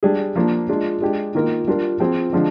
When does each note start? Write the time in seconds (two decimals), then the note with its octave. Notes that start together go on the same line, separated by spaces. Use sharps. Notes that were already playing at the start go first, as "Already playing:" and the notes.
0.03 G3 D4 G#4
0.36 F3 A#3 D4
0.69 G#3 D4 F4
1.01 G#3 D4 G4
1.35 D#3 A#3 F4 A#4
1.67 G3 D4 F4 A#4
1.99 F3 C4 F4 G#4
2.33 D3 F3 G#3 D4